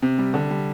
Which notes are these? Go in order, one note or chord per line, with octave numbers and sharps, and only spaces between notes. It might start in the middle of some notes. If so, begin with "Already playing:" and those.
C3
G3
D3
G3